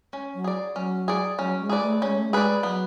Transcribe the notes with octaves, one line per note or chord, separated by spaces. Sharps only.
C#4
F#3
G#4 D5
F#3 C#4
G#4 D5
F#3 C#4
G#3
G#4 B4 D5
A3
G#3 C#4
A3
G#3
G#4 B4 D5
F#3 B3